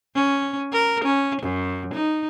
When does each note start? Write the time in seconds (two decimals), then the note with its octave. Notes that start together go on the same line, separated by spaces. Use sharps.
0.15 C#4
0.72 A#4
1.04 C#4
1.42 F#2
1.94 D#4